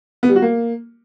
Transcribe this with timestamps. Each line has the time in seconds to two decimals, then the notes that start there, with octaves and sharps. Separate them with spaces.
0.23 B3
0.29 G3
0.36 F#4
0.42 A#3